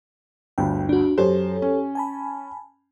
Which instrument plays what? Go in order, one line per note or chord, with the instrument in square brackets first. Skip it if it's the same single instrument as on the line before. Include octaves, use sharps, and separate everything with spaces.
[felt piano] G1 D2 [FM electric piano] G5
[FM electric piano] D4 F#4
[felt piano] F#2 C5 [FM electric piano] G4 A4 C#5
[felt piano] C#4
[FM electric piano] G#5 A5 B5